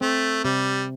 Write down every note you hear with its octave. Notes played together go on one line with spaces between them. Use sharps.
A3 C4
C3 G3